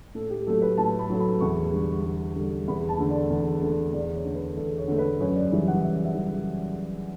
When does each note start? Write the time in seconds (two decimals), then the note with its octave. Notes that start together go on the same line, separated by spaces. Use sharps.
0.15 A2 A4
0.30 G4
0.47 F#3 A3 A4
0.62 B4
0.78 A2 A5
0.99 B5
1.10 F#3 A3
1.20 B5
1.40 E2 C#6
1.72 D3 G3
2.05 E2
2.36 D3 G3
2.68 E2 B5
2.89 A5
2.99 D3 A3
3.10 D5
3.30 E2
3.62 D3 A3
3.93 E2 D5
4.15 C#5
4.25 D3 A3
4.35 B4
4.57 E2 A4
4.78 C#5
4.88 D3 A3
4.98 B4
5.20 F#2 C#5
5.35 D5
5.51 C#3 E3 G3
5.68 F#5
5.83 F#2 E5
6.05 E5
6.15 C#3 E3 G3